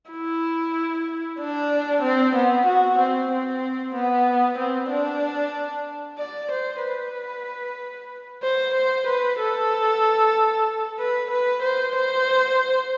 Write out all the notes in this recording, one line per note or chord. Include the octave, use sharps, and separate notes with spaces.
E4
D4
C4
B3
F#4
C4
C4
B3
C4
D4
D5
C5
B4
C5
C5
B4
A4
B4
B4
C5
C5